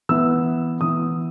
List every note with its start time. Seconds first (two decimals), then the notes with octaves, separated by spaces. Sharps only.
0.09 E3 B3 E4 E6
0.81 E3 B3 E4 D#6